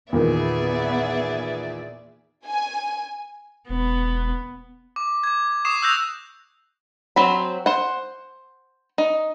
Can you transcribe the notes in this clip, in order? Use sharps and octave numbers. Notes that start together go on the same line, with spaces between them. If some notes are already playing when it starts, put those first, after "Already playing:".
E2 A#2 D#3 B3 G#4 D5 E5
G#5
E1 B3
D6
D6 G#6
C#6 D#6 C7 E7
C#6 E6 F#6 G6 A#6 F7
F#3 C4 B5
C5 F#5
D#4